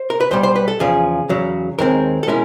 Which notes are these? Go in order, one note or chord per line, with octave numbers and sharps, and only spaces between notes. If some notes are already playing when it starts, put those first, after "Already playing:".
Already playing: C5
A#4
B4
B1 B2 G3 C5
C5
B4
A4
E2 C#3 F3 G#4
E2 C#3 F#3
D#2 D#3 G#3 C4 A#4
A4
B2 G#3 C#4 E4 A#4